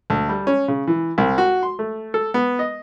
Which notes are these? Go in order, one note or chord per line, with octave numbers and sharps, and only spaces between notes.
D2
G3
C#4
C#3
E3
C2
F#4
C6
A3
A4
B3
D#5